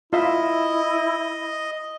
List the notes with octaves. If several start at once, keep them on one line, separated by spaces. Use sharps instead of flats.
E4 F4 D#5 E5